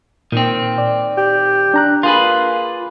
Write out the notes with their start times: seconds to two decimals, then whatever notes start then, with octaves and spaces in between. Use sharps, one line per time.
0.32 A#2 D#3 C4
0.78 D5
1.17 G4
1.74 D4 A#5 F#6
2.03 A#3 F4 G#4 B4 C6